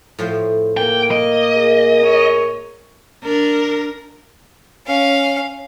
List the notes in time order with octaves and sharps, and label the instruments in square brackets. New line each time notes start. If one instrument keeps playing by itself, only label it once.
[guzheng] A2 F3 C5
[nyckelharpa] A#3 [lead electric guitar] G5
[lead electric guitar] D#5
[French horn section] G#4 A#4
[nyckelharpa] C#5
[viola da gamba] D4 [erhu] A#4
[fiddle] C#4 F5